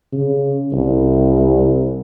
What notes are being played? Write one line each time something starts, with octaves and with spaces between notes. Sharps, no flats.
C#3
C2